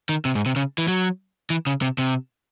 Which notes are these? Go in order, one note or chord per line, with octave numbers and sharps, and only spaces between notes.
D#3
C3
G#2
C3
C#3
E3
F#3
E3
C#3
C3
C3